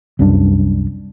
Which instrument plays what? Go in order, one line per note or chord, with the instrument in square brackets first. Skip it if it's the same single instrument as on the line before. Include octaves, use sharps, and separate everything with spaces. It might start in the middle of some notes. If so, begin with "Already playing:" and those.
[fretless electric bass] C2 F#2 G3 D4